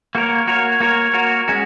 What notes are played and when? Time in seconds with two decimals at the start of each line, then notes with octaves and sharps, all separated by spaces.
0.15 A#3 F#4 A#4 C#5
0.47 A#3 F#4 A#4 C#5
0.80 A#3 F#4 A#4 C#5
1.13 A#3 F#4 A#4 C#5
1.48 G#3 C#4 F#4